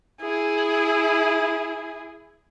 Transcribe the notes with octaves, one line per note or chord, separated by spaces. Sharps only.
E4 G#4